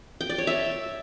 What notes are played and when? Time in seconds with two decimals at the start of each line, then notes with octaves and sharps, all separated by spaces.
0.21 G5
0.29 D5
0.38 C#5
0.47 E5